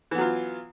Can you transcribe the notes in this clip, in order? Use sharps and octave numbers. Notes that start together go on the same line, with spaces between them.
E3 F#3 B3 F4